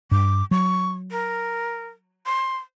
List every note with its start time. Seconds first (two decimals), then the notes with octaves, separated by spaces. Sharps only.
0.11 G2 D6
0.51 F#3 C#6
1.11 A#4
2.26 C6